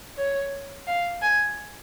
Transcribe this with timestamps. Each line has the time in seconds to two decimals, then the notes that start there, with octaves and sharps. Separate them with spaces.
0.17 C#5
0.87 F5
1.22 G#5